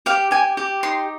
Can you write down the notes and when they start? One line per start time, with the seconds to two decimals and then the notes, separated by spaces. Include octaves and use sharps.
0.06 G4 F5
0.31 G4 G#5
0.57 G4
0.83 D#4 C6